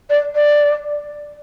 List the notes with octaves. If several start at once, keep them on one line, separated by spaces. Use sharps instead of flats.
D5
D5